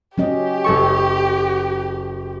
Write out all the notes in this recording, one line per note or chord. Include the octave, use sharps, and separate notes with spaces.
F#3 C#4 G4 D#5
F#1 A4 C#6